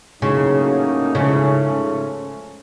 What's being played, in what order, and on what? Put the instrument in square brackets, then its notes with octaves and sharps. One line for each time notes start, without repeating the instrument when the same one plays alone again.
[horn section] A2 F#3 A#3 D#4 [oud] C#3
[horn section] G#2 F3 A3 C#4 [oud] C#3